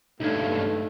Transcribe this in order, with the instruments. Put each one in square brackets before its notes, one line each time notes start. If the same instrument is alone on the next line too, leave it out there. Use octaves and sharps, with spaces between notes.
[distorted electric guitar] C#2 G2 [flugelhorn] A3 [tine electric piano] D#4 A4 G#6